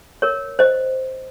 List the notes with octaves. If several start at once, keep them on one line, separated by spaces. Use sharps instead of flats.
A#4 C#5
C5 D#5